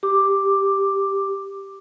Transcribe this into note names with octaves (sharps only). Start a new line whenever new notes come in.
G4 D6